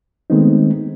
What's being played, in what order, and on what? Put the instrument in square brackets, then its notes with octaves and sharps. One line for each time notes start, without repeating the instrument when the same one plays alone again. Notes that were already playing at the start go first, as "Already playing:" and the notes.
[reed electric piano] D#3 G#3 A3 B3 C4 D#4